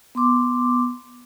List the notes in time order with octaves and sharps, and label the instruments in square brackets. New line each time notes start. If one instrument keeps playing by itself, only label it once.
[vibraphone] B3 C6 D6